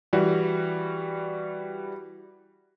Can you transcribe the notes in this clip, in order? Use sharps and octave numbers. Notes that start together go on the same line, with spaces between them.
E3 G3 F#4